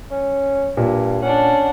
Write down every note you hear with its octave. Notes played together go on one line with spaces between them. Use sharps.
C#4
G2 A#2
C#4 D4 F#5